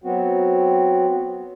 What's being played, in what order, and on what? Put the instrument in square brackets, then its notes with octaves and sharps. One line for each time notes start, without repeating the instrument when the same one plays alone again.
[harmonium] F#3 B3 C4 F#4